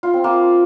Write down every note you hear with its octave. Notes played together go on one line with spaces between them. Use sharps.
F4
C4
A#3